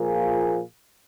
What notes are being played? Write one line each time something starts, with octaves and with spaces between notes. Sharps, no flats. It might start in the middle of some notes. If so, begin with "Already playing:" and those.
Already playing: A#2 F3 A#3 F4 G#4